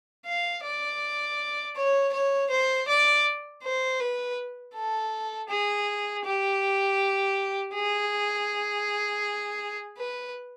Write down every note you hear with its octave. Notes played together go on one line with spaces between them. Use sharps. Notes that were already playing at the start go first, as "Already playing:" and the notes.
F5
D5
C#5
C#5
C5
D5
C5
B4
A4
G#4
G4
G#4
B4